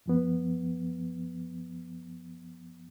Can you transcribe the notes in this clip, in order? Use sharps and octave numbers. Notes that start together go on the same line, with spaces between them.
F#2 F3 B3